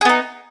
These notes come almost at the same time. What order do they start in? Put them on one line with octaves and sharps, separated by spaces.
G#4 B3 D#4